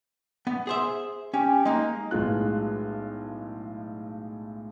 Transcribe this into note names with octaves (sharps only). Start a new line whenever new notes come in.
B3
G#4 C5 E5
C#4 G4
G#3 A#3 D#4
B1 A2 G#3 F4 F#6